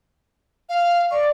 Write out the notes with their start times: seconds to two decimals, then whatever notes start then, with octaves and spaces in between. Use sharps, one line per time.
0.69 F5
1.11 D5 C#6